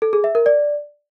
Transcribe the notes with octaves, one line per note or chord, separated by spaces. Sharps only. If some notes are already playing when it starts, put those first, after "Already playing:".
A4
G#4
E5
A#4
D5